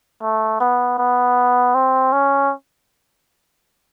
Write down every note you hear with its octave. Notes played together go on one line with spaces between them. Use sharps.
A3
B3
B3
C4
C#4